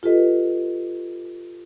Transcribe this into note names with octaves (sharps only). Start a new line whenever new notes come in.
F4 G4 A4 B4 D#5